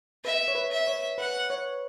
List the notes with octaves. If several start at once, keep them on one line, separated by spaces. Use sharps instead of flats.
B4 E5
C#5
B4
E5
C#5
B4 F#5
C#5